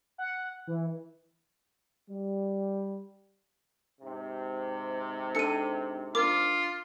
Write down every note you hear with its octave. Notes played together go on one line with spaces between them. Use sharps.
F#5
E3
G3
G#2 C3
D4 A4 A5 C#7 D#7
D4 F4 A#4 D6